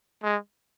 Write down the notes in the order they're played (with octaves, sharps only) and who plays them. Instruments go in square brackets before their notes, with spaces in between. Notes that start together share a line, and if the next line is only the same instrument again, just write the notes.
[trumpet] G#3